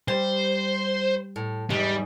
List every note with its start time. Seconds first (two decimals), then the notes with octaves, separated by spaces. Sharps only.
0.08 G3 C5
1.36 A2
1.70 E2 G#2 G3